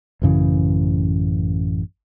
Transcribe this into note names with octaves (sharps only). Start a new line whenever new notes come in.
A1 F#2 C#3 E3